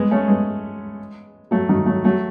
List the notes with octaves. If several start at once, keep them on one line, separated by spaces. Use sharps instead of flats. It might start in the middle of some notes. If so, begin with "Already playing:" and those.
Already playing: G#3 B3
A3 C#4
G#3 B3
F#3 A3
D#3 F#3
F#3 A3
F#3 A3